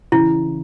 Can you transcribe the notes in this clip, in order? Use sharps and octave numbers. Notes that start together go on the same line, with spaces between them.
C#3 E3 E4